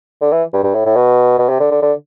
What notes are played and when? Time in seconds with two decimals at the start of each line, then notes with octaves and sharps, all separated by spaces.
0.21 D3
0.32 E3
0.53 G2
0.64 G2
0.74 A2
0.86 A2
0.96 B2
1.39 B2
1.49 C3
1.60 D3
1.71 D3
1.82 D3